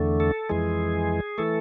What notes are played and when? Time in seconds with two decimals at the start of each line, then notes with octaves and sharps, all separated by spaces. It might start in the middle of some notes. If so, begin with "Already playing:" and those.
Already playing: E2 D3 A3
0.20 A4
0.49 F2 E3 G#3 G#4
1.38 E3 A3 A4